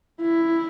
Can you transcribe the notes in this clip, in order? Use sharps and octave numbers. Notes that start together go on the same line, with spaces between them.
E4